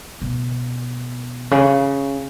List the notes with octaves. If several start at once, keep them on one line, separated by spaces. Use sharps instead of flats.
B2
C#3